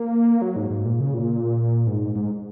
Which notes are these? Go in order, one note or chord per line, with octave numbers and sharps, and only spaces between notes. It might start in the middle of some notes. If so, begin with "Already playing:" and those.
Already playing: A#3
F#3
G#2
G#2
A#2
C#3
A#2
G#2
G#2